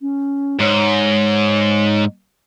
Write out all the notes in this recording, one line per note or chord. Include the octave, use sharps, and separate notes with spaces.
C#4
G#2 C#5